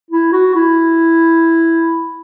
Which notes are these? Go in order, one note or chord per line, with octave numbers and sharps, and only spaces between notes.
E4
F#4
E4